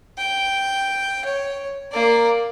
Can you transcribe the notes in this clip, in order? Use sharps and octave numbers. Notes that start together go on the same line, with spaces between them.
G5
C#5
A#3 D5